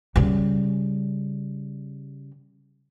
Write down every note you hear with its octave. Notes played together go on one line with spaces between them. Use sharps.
C#3 G3